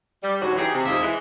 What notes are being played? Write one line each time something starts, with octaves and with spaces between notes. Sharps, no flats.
G3
D2 G#2 F#3 C#4 F#4
E3 D#4 G4 G#4
C3
D#2 A#2 F3 G#3 D#5 E5
E3 G#3